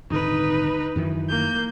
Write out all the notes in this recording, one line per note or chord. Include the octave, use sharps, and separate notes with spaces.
D#1 G#1 D3 D#4 B4
F#2 D#3 E3
A#3 G6